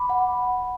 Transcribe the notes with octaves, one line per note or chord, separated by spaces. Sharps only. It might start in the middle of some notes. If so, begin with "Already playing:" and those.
Already playing: B5 D6
F#5